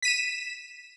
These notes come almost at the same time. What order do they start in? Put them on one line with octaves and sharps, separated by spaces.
B6 D#7 E7